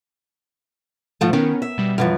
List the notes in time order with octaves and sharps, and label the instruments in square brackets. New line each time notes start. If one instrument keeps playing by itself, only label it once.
[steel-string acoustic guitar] G#2 F3 A3
[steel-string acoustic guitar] D#3 [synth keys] B3 C#4 A#4
[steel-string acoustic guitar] E5
[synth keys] B2 G3
[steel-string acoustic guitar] F#2 E3 F3